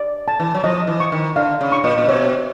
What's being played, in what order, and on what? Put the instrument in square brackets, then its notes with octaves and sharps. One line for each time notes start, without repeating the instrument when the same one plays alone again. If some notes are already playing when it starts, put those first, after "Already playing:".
Already playing: [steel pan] D5
A5
[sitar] E3
F#3
[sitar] F3 [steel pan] D#5
[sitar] E3
[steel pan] C#6
[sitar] D#3
[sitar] D3 [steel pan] F5
[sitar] C#3
[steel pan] C#6
[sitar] A#2
A#2
[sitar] B2 [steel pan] C#5